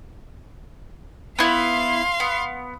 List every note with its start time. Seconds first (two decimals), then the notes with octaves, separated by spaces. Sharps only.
1.39 B3 E4 F5 C6
2.20 B3